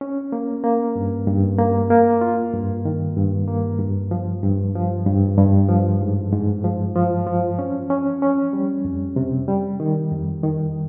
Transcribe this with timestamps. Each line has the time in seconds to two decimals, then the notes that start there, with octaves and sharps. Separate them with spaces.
0.01 C#4
0.32 A#3
0.64 A#3
0.96 G2
1.27 G2
1.59 A#3
1.90 A#3
2.21 F4
2.53 G2
2.85 D#3
3.17 G2
3.48 A#3
3.79 G2
4.11 F3
4.43 G2
4.75 F3
5.06 G2
5.38 G2
5.69 F3
6.01 G#2
6.32 G#2
6.64 F3
6.95 F3
7.27 F3
7.59 C#4
7.90 C#4
8.22 C#4
8.53 G3
8.85 F2
9.16 C3
9.48 G3
9.80 D#3
10.12 F2
10.43 D#3